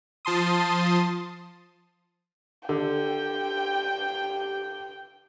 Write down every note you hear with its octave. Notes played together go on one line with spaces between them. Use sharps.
F3 A5 C6 D#6
D3 G4 G5